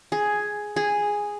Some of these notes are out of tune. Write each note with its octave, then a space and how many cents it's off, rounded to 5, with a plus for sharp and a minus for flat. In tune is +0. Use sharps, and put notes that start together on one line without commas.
G#4 +5
G#4 -5